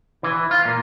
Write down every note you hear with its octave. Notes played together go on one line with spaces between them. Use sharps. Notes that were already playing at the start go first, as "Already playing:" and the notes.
E3
F4
A#2